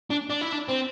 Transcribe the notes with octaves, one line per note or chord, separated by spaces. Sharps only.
D4
D4
E4
D4
C4